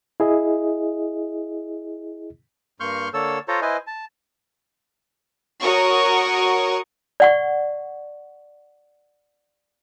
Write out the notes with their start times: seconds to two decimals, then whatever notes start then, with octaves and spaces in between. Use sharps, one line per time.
0.20 E4 G#4 D#5
2.80 G2 A#3 C6 C#6 F6 G6
3.14 D3 A#3 A4 C#5 E6
3.48 F4 A4 C5 C#5 A#5
3.62 E4 B4 C5 D#5 G#5
3.87 A5
5.61 F#4 A#4 C#5 F#5 C#6 D#6
7.20 D5 F#5 C#6